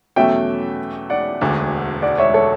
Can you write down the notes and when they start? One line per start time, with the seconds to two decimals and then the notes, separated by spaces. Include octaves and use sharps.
0.16 E2 B2 F#3 A3 C#4 E5 G5
1.10 D5 F#5
1.41 E1 D2 D3
2.02 D5 F#5
2.18 C#5 E5
2.34 A4 C#5